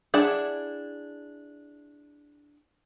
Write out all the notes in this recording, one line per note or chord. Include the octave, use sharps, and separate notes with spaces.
D4 E4 G#4 D5 F#5